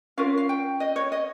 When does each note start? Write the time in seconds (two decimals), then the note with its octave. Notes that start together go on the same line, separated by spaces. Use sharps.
0.17 C#4 F4 A#4 F5
0.37 F5
0.49 G5
0.80 D#5
0.96 C#5
1.12 D#5